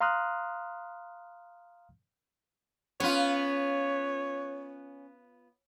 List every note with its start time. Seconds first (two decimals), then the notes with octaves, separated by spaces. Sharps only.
0.01 F5 A#5 C6 D#6 F6 F#6
3.00 B3 C#4 F4 C#5